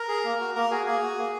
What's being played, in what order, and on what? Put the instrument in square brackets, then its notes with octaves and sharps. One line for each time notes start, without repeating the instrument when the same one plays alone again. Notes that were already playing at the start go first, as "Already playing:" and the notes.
Already playing: [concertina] A#4 A#5
G#4
A#3
F#4
A#3 A#4 A#5
F#4 G#4 G#5
A#3 G#4 G#5
F#4
A#3